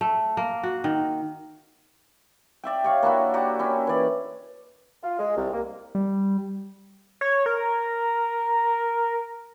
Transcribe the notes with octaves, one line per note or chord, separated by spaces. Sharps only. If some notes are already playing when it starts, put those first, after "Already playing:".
A3
A#3
F#4
D#3
D5 E5 G5
G4 C#5 F5
A#3 D4 E4 F#4
F#4 G4 D5 A#5
C#4 E4
E3 D5
F4
G#3
C2
A#3
G3
C#5
A#4